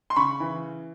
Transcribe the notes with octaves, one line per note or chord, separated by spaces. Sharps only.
C6
C#3 B5 C#6
E3